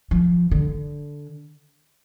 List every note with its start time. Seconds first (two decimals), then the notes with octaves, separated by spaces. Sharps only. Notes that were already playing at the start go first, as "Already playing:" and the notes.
0.11 F3
0.51 D3